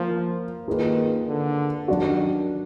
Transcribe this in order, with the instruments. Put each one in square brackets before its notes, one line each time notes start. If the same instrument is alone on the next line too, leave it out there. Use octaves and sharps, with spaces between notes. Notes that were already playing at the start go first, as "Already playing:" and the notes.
Already playing: [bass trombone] F3 [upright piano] A#3
[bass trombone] D#3 [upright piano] A#3 F4 G#4 B4
[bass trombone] D3
[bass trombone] D#3 [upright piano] F#3 D4 F#4